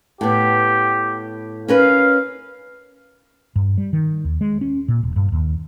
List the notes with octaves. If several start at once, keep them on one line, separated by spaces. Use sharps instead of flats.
A2 B3 G4
C#4 A#4 B4 F5
G2
G3
D#3
D#2
G#3
C#4
A#2
E1
G2
D#2